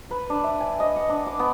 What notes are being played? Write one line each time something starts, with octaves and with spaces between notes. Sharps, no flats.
B4
D4
E5
G#5
D#5
F#5
D4
D6
B3